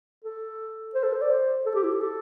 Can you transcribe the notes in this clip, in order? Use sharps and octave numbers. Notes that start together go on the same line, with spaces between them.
A4
C5
A4
C5
D5
C5
A4
G4
E4
G4
A4